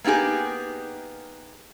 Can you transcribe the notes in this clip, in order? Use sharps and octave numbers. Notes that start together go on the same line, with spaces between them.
A#3 B3 D#4 G4 G#4